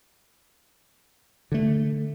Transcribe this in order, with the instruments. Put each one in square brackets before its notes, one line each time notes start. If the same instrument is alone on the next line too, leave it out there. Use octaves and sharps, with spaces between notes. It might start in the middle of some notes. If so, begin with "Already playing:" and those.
[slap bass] D3 A3